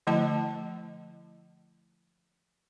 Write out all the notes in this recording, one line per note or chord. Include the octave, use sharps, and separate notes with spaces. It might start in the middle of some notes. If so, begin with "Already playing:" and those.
D3 F3 A3 E4 D#5 A5